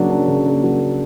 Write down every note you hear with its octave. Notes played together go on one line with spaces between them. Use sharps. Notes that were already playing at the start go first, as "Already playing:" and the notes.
Already playing: C#3 F#3 A#3 D4
D4
C#3
A#3
F#3